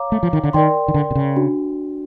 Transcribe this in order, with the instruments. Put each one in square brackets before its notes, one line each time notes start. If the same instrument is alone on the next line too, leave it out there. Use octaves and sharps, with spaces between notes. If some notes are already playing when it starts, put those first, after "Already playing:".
Already playing: [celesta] C#5 F5 A#5 D6
[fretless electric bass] A3
F3
D#3
D3
[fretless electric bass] D#3 [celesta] A#4 D5 G5 C6
[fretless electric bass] D#3
D3
C3
C#3
[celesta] D4 F#4